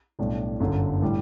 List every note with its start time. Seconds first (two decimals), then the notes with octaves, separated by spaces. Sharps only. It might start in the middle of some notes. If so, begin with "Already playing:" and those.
0.19 B1 A2 G3 D4
0.60 G1 F#2 D3
1.02 A2 E3 G3